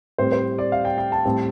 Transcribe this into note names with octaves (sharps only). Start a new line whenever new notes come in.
A2 G3 C4 C5
C5
D5
F5
G5
G5
A5
A2 G3 C4